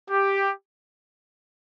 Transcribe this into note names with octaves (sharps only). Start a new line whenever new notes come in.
G4